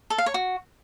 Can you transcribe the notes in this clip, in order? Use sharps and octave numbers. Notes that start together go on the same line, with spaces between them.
A4
F5
C#5
F#4